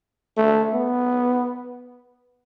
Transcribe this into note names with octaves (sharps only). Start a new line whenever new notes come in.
A3
B3